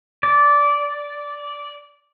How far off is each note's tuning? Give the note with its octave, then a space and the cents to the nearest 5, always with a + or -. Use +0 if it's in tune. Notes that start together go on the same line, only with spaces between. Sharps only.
D5 -15